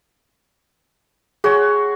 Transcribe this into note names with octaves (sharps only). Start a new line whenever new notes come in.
F#4 G#4 C#5 C6